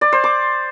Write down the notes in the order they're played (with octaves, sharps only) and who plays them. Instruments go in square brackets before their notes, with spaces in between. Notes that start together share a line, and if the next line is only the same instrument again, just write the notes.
[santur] D5
C5
D6